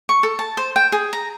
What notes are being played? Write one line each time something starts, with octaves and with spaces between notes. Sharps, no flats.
C#6
A4
A5
C5
G5
G#4
A#5